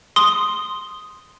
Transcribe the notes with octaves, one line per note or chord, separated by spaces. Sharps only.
C6 D#6 G7